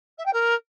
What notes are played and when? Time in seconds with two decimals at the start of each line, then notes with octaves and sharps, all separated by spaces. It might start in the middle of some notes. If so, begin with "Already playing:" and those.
0.18 E5
0.25 G5
0.33 A#4